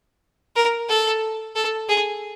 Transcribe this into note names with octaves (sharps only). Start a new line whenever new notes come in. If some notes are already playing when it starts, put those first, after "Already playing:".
A#4
A4
A4
G#4